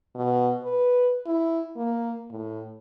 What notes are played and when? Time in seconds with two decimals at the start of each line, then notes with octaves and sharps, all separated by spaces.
0.15 B2
0.64 B4
1.26 E4
1.77 A#3
2.31 A2